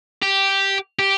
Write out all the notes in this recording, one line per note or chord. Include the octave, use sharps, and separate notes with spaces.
G4
G4